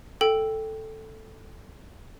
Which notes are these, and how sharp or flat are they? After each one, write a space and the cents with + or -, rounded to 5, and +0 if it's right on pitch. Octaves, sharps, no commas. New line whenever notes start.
A4 +0 G5 +0